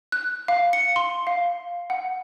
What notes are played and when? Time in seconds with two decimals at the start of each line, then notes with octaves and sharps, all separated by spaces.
0.12 F#6
0.48 F5
0.73 C#7
0.96 C6
1.27 F5
1.90 F#5